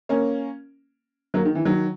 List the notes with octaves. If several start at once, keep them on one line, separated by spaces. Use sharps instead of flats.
A#3 C#4
F#3 A#3
D#3
E3
D#3 F#3